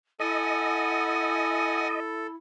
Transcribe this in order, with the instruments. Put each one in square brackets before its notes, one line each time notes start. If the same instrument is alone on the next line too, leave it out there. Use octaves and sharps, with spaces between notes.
[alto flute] E4 [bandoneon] A4 [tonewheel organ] D#5 [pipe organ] F#5 G#5